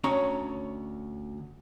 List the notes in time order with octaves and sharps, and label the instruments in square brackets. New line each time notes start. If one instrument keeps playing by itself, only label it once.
[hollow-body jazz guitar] D2 C#4 C#5 A#5